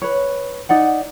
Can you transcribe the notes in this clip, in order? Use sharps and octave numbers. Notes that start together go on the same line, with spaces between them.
B4 C#5
D#4 D5 F#5